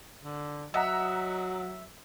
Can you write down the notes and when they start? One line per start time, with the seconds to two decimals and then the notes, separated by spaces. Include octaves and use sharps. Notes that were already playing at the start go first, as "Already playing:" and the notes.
0.24 D3
0.74 F#3 D#5 E5 F#5 A#5